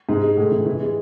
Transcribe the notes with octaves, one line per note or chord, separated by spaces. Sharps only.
G#2
G#3
A2
E3
E3
G#3